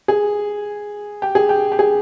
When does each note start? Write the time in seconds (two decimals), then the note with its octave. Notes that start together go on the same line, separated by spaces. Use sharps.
0.08 G#4
1.22 G4
1.35 G#4
1.49 G4
1.72 G4
1.79 G#4